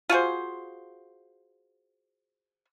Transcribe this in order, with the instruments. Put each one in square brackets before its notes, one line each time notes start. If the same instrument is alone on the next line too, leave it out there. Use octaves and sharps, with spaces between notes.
[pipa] F4 F#4 G#4 C5